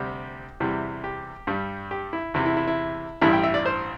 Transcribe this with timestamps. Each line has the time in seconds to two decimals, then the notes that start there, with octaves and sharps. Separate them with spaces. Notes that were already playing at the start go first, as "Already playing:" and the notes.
Already playing: D2 C3 G3 G4
0.60 E2 C3 E3 G3
1.04 G4
1.47 G2 G3
1.91 G4
2.13 E4
2.34 E2 C3 E3 E4
2.46 E4
2.57 E4
2.67 E4
3.22 A1 G2 E3 G3 E4
3.33 G5
3.43 E5
3.54 D5
3.66 C5